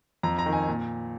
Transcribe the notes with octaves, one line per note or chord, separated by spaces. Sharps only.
F2 A#5
A#5
D#3
G#5
A#2